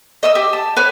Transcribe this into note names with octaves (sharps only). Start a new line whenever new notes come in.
D#5 D#6 E6
G4
A5
B4 C#5 F#6